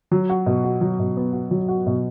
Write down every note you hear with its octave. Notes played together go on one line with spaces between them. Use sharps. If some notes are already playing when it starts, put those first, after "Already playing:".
F#3
F#4
B2
F#4
F#3
B2
B3
F#4
F#3
F#4
B2